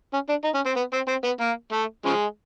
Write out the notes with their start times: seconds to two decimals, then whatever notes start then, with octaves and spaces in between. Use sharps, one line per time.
0.13 C#4
0.29 D4
0.44 D#4
0.55 C#4
0.66 C4
0.76 B3
0.93 C4
1.08 C4
1.24 B3
1.41 A#3
1.73 A3
2.05 C#3 F3 G#3